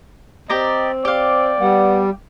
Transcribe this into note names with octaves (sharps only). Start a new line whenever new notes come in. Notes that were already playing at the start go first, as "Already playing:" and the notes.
C4 G4 D5 D#5 A#5
G4 D5 F5
G3 B3